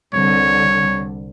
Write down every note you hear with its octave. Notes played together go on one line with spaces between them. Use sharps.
C2 D3 C#5